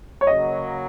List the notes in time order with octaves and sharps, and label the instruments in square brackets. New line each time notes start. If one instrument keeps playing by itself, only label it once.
[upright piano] C#5
[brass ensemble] C#3 F#3 A#3 [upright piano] D#5